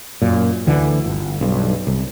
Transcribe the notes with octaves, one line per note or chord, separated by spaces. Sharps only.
F#2 A#2
D2 D3 E3
G1
B1 G2
C2